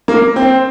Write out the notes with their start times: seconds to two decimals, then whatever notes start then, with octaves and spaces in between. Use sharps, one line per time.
0.08 A#3
0.36 C4